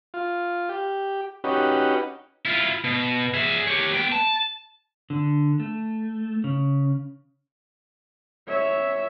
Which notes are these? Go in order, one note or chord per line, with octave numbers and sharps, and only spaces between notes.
F4
G4
C#4 D#4 F#4 G4 B4
E4 F4
B2
G#4 E5
G4 C#5
B3 G5
A5
D3
A3
C#3
C#5 E5